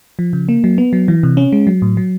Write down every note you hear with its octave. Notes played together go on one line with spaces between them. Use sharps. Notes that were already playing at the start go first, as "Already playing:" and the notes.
F3
C#3
A#3
F#3
B3
F#3
E3
C3
C#4
G#3
F#3
A2
F#3